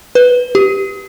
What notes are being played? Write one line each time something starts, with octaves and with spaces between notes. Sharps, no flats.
B4
G4